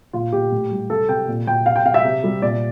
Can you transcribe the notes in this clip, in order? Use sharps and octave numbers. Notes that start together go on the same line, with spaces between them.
A#2 F4
A#2 G4
A2
G3
C3 A4
C3 G5
A#2
A#2 G5
C3 F5
G5
C3 F5
E5
C3
G3
A#2 D5